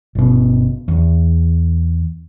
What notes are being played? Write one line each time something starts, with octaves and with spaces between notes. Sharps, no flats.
G1 B2
E2